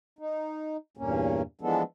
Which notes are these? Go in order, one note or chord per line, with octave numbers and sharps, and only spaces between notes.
D#4
E2 G2 A#2 A#3 C#4
E3 F3 G#3 B3 D4 A4